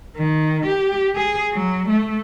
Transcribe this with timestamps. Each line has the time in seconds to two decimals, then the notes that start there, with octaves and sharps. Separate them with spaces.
0.16 D#3
0.66 G4
1.16 G#4
1.52 F#3
1.89 A3